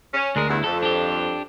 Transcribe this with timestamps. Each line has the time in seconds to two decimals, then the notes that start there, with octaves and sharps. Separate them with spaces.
0.14 C#4
0.36 D2 G#3 D4 A#4
0.49 E2 G2 E4
0.64 F2 A4
0.83 D4 G4